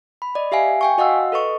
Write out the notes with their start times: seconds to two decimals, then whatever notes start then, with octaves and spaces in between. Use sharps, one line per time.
0.22 B5
0.35 D5 D#5
0.52 G4 E5 F5 G#5 C7
0.81 G5 G#5 C#6
0.98 F#4 D#5 F5 F#5 E6
1.32 A4 B4 D#5 C#6